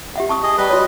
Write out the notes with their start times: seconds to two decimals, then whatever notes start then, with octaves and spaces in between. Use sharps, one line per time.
0.16 G4 E5 F#5
0.29 A5 C#6 D#6
0.43 G#4 D#5
0.58 G3 B4 D#5
0.70 F#4 C#5